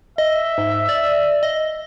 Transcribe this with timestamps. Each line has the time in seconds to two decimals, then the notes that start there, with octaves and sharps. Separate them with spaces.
0.18 D#5 E5
0.58 G#2
0.89 D5
1.43 D#5